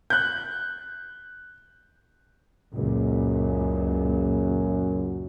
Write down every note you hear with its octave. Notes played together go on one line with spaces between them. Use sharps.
F#6 G6
C#2 F#2 A#2